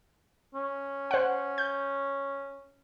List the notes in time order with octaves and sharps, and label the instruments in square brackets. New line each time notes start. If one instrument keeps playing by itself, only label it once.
[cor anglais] C#4
[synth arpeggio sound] C5 F#5
G6